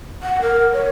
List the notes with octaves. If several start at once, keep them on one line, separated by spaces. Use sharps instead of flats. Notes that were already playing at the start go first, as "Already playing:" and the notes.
F#5
A#4
C#5